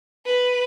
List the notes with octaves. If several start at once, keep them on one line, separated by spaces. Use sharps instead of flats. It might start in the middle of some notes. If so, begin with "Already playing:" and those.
B4